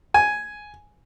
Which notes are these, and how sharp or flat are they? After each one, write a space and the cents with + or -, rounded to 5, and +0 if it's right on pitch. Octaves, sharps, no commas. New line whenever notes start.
G#5 +5